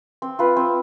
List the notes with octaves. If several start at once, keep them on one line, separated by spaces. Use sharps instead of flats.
C4
F4 B4
C4